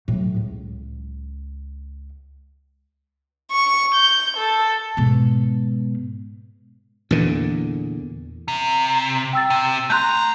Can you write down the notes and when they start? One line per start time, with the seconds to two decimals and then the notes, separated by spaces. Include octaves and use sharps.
0.08 A2 F#3
0.36 C#2
3.51 C#6
3.95 G6
4.37 A4
4.97 G#2 B2
7.11 E2 A#2 D3
8.48 C3
9.33 G5 E6 A6
9.50 C3
9.90 A3 A#5 C6 F#6 G6